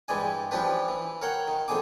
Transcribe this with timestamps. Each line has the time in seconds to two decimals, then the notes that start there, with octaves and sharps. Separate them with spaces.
0.08 G2 E3 G#3 D5 G#5
0.51 E3 F3 C#4 D4 G4 B4
0.88 E3
1.22 A#4 C#5 F#5 G5
1.47 D#3
1.68 F2 D3 G#4 G#5 D6